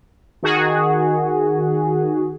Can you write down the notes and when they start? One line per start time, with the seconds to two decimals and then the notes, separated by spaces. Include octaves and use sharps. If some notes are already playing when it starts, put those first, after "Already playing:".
0.43 D#3 F#4 G#4